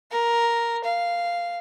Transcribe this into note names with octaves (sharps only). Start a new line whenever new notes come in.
A#4
F5